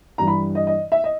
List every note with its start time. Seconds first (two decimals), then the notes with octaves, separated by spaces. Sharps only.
0.18 G2 E3 G3 A#5
0.28 B5
0.55 D#5
0.67 D#5
0.92 E5
1.04 D#5